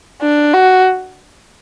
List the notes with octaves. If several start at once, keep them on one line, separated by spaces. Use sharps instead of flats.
D4
F#4